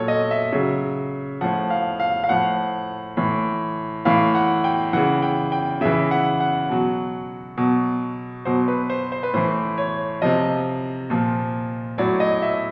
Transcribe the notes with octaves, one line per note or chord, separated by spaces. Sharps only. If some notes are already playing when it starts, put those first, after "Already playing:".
Already playing: A#2 F#3 A4 C#5
D#5
E5
C#3 F#3
A2 F3 F#5
F5
F5
F5
A2 F3 F#5
A2 E3
A2 E3 F5
F#5
G5
C#3 E3 F#5
G5
G5
C#3 E3 E5
F#5
F#5
B2 F#3
B2 F#3
B2 F#3 C5
B4
C5
C5
B4
A2 E3 C5
C#5
C3 F3 D#5
A#2 F3
A2 F#3 D5
D#5
E5